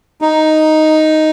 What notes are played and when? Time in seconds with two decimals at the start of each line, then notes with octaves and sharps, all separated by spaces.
0.21 D#4